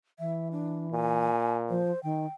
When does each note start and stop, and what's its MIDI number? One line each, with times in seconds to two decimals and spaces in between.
0.19 1.28 52
0.19 0.49 76
0.52 0.87 62
0.92 1.81 46
0.92 1.55 80
1.69 1.91 53
1.69 2.03 72
2.03 2.26 51
2.03 2.32 79